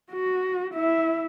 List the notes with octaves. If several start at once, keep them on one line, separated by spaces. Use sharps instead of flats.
F#4
E4 E5